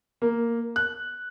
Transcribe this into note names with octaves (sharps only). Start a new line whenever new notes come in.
A#3
F#6